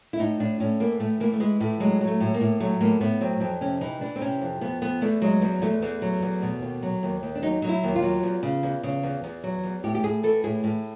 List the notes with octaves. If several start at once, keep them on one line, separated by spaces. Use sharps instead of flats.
E4
A2 D#4
A2 D4
A2 C#4
E3 A#3
A2 A3
E3 A#3
A3
E3 G#3
A2 A3
F#3 G#3
F#3
A3
A2
A#3
A2
F#3 A3
A2 A#3
A2 B3
F#3 C4
F2 C4
C3 C#4
E3 D#4
E3 D4
C4
C3 C#4
F2
F2 B3
F2 B3
E2 A3
F#3 G#3
E2
E2 A3
E2
F#3
E2
B2
D#2
F#3
D#2
D#2
D4
F#3 D#4
F#3 D#4
E4
D#2
F4
F#3
E2
C#3
E2
C#3
E2
E2
F#3
E2
A2 G4
G4
A2 G#4
E3 A4
A2 G#4
A2